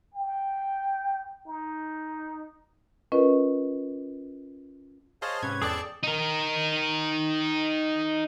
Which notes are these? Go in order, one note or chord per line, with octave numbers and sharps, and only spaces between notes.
G5
D#4
C#4 F4 A#4 B4 D#5
G#4 C5 C#5 D#5 F5 A5
G#2 C3 C#4 B4 C#5 G#6
E2 G#4 A4 D5 G5 A5 E6
D#4 A#4